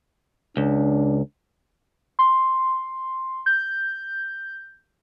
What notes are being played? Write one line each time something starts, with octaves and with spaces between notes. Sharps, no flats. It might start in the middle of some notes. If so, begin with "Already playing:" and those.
C#2 D4
C6
G6